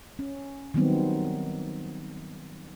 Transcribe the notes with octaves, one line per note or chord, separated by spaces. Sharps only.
C#4
D#3 F#3 G3 B3 C4 D#4